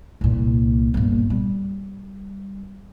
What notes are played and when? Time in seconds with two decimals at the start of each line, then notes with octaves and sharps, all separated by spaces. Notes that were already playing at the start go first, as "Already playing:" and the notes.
0.21 C2 A#2
0.94 G1 A#2
1.30 G3